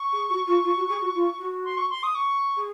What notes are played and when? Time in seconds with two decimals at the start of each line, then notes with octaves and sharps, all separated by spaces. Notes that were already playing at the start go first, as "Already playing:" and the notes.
Already playing: C#6
0.13 G#4
0.30 F#4
0.47 F4
0.64 F4
0.76 F#4
0.89 G#4
1.01 F#4
1.14 F4
1.39 F#4
1.65 C6
1.77 C#6
1.90 C6
2.03 D#6
2.15 C#6
2.57 G#4